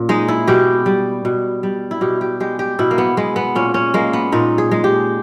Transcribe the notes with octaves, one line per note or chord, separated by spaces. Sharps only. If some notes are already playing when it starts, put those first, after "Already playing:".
Already playing: A#2 C#4
G#3 D#4
E4
B2 G4
G3
B2
G3
E4
B2 G4
G4
G#3 G4
G4
B2 E4
A#3
B3
G#3 B3
B3
A#2 C#4
C#4
G#3 A#3
B3
A#2 D#4
G#4
G#3
G4